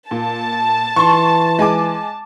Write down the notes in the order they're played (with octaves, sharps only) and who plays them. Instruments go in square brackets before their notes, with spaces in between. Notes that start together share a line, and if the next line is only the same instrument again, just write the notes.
[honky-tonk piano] A#2 [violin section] A5
[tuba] E3 [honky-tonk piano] C6 C#6
[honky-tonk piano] G#3 G#5 D6